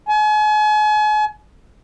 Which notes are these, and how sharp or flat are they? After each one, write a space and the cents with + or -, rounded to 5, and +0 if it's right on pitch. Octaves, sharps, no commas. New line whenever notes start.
G#5 +40